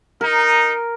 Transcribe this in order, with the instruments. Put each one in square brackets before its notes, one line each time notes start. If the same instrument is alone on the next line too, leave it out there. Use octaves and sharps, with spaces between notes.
[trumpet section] D#4 [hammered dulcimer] A#4